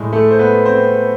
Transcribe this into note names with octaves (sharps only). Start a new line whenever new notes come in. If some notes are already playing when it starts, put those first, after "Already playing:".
Already playing: A2 G#3
A3 A4
C5
B3 B4
C4 C5